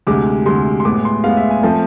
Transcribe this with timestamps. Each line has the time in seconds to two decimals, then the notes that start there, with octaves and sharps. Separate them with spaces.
0.07 D2 C3 G#3 D6
0.46 D2 C3 G#3 C6
0.80 C6
0.85 A2 G#3 B3 D6
1.05 C6
1.24 A2 G#3 B3 F5
1.37 E5
1.50 G#5
1.63 F3 A3 C4 A5